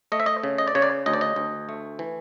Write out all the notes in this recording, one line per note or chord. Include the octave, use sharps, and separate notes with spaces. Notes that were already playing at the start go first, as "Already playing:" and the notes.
A3 D#5
E5
D#5
C#3
D#5
D5
C#3 C#5
D5
D2 D#5
D5
D#5
D2
A3
E3